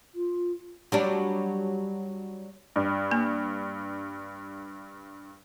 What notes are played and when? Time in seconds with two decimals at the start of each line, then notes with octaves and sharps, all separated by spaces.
0.15 F4
0.92 F#3 G3 D4
2.76 G2
3.11 A#3